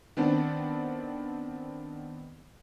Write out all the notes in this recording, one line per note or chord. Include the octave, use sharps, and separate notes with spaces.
D#3 B3 C4 D4